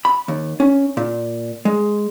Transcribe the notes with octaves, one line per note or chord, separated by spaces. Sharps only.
B5
D#2
C#4
A#2
G#3